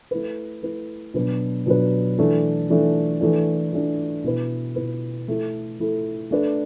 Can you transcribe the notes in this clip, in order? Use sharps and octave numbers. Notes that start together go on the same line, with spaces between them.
A3 E4 B4
A3 E4 B4
B2 F#3 D4 B4
B2 F#3 D4 B4
E3 A3 D4
E3 A3 D4
E3 A3 D4
E3 A3 D4
B2 B3 E4 B4
B2 B3 E4 B4
A3 E4 A4
A3 E4 A4
A3 D4 B4